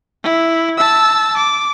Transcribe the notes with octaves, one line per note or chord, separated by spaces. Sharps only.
E4
A5 E6
D6